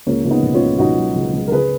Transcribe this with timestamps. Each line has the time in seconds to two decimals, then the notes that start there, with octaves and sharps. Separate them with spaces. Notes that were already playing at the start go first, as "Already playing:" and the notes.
0.07 C#2 A#3 C#4
0.25 C#2
0.30 B3 D#4
0.43 B2
0.54 C#4 F4
0.61 C#2
0.79 B2 D#4 F#4
0.97 F#3
1.15 C#2
1.33 C#2
1.47 A#4
1.52 C#3 G#4 B4